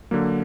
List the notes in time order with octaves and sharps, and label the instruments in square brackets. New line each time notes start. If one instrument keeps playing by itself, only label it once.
[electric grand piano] D3 F#3 A#3